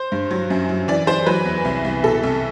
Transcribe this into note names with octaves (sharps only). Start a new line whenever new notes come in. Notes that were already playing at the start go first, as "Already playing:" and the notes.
Already playing: C5
G2
F#3
F#2
F#3
E3 D5
E3 C5
F#3 B4
E2
C2
C2
B2 A4
C2